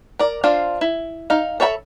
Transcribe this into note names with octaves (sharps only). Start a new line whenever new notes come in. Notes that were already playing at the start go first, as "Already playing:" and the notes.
A#4 D5
D4 F4 C5 F5
E4
D#4 F5
A4 C#5 E5 G5 B5